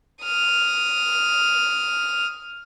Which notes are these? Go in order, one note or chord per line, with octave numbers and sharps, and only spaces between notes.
D#6 F6